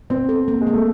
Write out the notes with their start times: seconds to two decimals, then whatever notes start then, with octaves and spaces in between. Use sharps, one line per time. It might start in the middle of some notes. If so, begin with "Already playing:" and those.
0.10 B3 C4
0.29 A4
0.48 A#3
0.61 G#3
0.67 A#3
0.73 A3